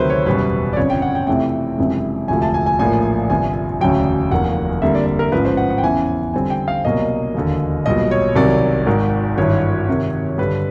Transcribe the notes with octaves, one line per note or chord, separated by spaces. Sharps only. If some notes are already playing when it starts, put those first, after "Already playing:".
Already playing: D2 C3 D#3 F#3 A3 B4 C5
C#5
F#1 E2 B2 G3 B4
D5
G1 F2 C#3 C#5
G5
F#5
G5
F2 C3 E3 A3 G5
F#1 F2 C3 E3 G#3
E1 D2 C3 F3 A3 G#5
A5
G#5
G#5
A#1 A2 F3 A#3 G#5
G1 F2 C3 G#5
E1 D2 C#3 F#3 G5
F1 D#2 D#3 F#5
F2 D3 G3 A#3 E5
D5
D5
A#4
A1 G#2 F3 B4
C5
F#5
F#5
G5
E2 C#3 E3 G#5
F2 D3 G3 C4 G#5
G5
F5
C2 B2 F#3 A#3 D#5
E1 D#2 D3
B1 A#2 G3 B3 D#5
C#5
C2 C3 D#3 F#3 D5
G#1 G#2 D#3
G#1 G2 E3 C#5
F2 C3 D#3
G2 D3 G3 B4